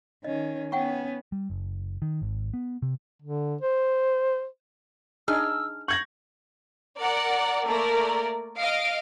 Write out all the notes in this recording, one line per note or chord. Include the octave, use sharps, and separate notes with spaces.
D#3 C#4 D#5
B3 C#4 F#5 G5 C#6
G3
F#1
D#3
G#1
B3
C3
D3
C5
D4 D#4 G#4 E6 F6
C#6 G6 G#6 A#6 F#7
A#4 D5 F#5
A3 A#3 A#4 D5
D#5 F5 D7